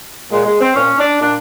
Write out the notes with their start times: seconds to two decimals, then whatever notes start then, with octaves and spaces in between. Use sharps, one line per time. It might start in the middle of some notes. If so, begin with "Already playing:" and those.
0.30 A#2 G#3
0.44 G#3
0.59 C4
0.74 A#2 C#4
0.97 D4
1.19 A#2 D4